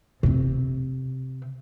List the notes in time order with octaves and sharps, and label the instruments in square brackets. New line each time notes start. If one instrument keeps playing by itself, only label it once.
[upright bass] C3 C4